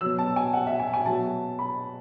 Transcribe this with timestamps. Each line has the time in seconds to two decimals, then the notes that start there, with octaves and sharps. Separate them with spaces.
0.01 B2 F#3 E6
0.19 A5
0.36 G#5
0.53 F#5
0.67 E5
0.80 G#5
0.93 G#5
1.06 B2 F#3 A5
1.59 B5